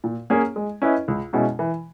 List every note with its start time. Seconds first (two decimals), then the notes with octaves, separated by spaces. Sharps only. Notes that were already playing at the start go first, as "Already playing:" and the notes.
0.04 A#2
0.30 A#3 C#4 G#4 C#5
0.56 G#3
0.82 C#4 E4 B4 D#5
1.08 C#2
1.33 B2 G#3 C#4 E4
1.59 E3